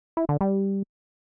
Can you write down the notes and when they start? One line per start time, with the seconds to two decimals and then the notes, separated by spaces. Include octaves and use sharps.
0.17 E4
0.29 D3
0.41 G3